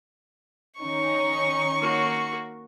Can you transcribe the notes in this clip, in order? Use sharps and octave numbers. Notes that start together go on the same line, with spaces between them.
D#3 C#4 D#4 C#6
A#3 F#4